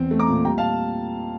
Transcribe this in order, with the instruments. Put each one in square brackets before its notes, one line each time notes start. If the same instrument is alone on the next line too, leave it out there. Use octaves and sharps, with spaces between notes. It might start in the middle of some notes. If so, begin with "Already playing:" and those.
Already playing: [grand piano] E2 C4
A3
A#5 D6
A#2
G3 G5 A#5
F5 A5